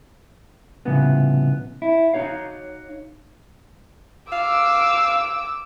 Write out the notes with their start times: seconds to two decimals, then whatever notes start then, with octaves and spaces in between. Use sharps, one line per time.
0.85 C2 A2 C#3 F3 B3
1.82 E4
2.13 D#4 F#4 C#5 F5
4.33 F5 D6 E6